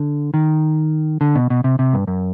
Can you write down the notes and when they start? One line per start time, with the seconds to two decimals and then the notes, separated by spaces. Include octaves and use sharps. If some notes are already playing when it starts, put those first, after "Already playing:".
Already playing: D3
0.34 D#3
1.21 D3
1.35 B2
1.50 B2
1.64 C3
1.79 C3
1.93 G2
2.07 F#2